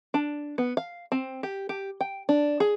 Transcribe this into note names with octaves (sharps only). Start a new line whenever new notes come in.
D4
B3
F5
C4
G4
G4
G5
D4
G#4